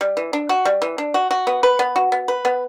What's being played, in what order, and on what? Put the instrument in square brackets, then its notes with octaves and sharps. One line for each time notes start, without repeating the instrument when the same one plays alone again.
[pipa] G3
E3
D4
F#4
G3
E3
D4
F#4
F#4
B3
B4
B3
F#4
B3
B4
B3